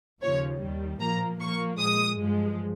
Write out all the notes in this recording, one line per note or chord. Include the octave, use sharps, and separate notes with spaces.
D#2 C#3 F3 C#5
D#2 D#3 G3
A#2 F3 A#3 A#5
A#2 F3 A#3 C#6
A#2 G#3 D#6
G2 F3 G#3